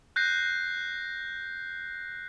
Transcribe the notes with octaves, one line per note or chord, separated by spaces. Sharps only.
F#6 G6 A#6 C7